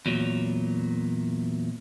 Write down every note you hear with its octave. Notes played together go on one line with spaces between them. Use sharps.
E2 A#2 F#3